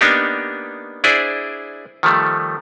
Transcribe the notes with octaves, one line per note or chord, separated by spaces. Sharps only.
A#3 B3 D4 D#4 G4
D4 E4 G#4 C5 D5
D#3 F3 G3 A3